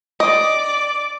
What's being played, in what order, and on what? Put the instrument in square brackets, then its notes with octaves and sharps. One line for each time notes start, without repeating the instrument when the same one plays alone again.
[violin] D5 D6 [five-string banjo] D#5